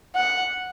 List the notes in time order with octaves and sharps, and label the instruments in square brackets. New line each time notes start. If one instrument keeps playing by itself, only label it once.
[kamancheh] F#5